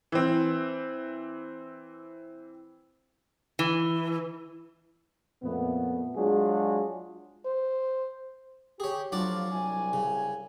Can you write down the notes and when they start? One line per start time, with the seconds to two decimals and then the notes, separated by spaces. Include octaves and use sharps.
0.12 E3 C4
3.59 E3
5.43 F2 A#2 A3 B3
6.16 F#3 G#3 D4 F4 F#4 G#4
7.46 C5
8.80 G4 G#4 C#5
9.12 A2 F3 F#3 D4 F4 D5
9.51 C2 G#5
9.93 C#3